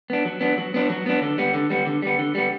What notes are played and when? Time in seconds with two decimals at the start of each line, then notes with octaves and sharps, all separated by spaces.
0.10 B3 D4
0.25 F#3
0.41 B3 D4
0.58 F#3
0.74 B3 D4
0.90 F#3
1.06 B3 D4
1.22 D3
1.38 G3 B3
1.54 D3
1.70 G3 B3
1.87 D3
2.02 G3 B3
2.19 D3
2.35 G3 B3